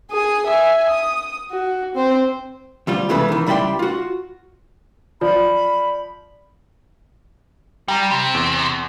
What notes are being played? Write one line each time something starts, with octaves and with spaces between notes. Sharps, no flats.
G#4 D#6
E5 G#5
D#6
F#4
C4 C5
D2 G3 F4
C2 C#3 E3 G#3 A3 B3
D#3 E3
C#2 G3 E4 D5 G5 C6
F4 F#4
F3 D5 B5
G3 G5 A#5
C3
E2